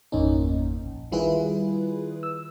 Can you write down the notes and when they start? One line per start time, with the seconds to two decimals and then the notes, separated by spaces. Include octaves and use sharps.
0.12 G1 E2 A#2 A#3 C#4 D#4
0.85 A#1
1.12 D#3 G3 E4 F4 G#4 B4
2.23 E6